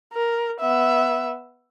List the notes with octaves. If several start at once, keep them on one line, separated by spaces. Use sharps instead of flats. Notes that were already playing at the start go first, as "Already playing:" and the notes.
A#4
B3 E5